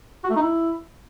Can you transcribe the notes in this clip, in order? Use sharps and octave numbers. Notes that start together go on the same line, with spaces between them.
F#4
A3
D#4
E4